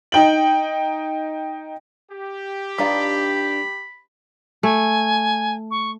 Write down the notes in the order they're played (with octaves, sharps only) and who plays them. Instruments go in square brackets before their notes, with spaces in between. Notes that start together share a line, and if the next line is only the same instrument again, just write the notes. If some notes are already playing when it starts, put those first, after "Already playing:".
[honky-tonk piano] D#4 G5 F#7
[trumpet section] G4
[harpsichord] G2 [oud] D4 D#4 F4 [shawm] B5
[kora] A3 [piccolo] G#5
[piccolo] C#6